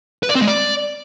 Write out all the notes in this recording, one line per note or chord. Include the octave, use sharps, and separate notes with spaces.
B4
D5
C4
G#3
D5